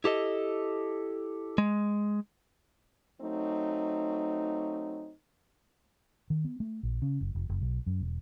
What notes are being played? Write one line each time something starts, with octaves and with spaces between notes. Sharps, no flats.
E4 G4 A4 D#5
G#3
F#3 A3 C4 D#4
D#3
B3
A3
A#1
C#3
F#1
F1
F#1
B1
F#2
E1